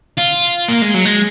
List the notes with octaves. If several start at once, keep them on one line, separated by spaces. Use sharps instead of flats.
F4
A#3
G#3
F#3
G#3